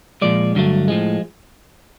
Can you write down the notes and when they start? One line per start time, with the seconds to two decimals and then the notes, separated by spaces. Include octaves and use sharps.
0.22 A#2 F3 G#3 D5
0.55 G2 D3 F#3 A3
0.88 A2 F3 G#3